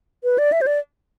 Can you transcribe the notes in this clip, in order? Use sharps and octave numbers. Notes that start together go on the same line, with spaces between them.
B4
D5
E5
C5
D5